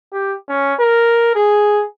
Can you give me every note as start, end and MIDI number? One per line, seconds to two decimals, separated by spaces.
0.13 0.35 67
0.49 0.74 61
0.80 1.31 70
1.36 1.84 68